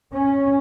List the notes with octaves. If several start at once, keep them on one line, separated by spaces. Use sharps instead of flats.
C#4